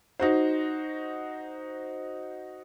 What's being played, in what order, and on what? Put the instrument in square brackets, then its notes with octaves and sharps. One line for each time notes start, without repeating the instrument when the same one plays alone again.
[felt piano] D#4 F#4 C5